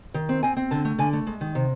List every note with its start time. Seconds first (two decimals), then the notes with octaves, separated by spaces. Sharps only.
0.14 D#3
0.29 C4
0.43 C4 G#5
0.57 C4
0.71 D3 A5
0.85 A3
0.98 D3 G#5
1.13 A3
1.27 G#3
1.41 D#3
1.55 C3